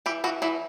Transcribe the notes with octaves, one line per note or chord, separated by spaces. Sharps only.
E3 G4
E3 F#4
E3 E4